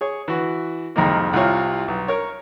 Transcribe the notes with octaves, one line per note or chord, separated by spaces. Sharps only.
G#4 C#5
E3 F#4
C2 F2 D#3 G#3 A#3
C2 C3 E4 F4 C#5
B1
A#4 C#5